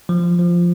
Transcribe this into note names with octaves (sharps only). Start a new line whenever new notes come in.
F3
F3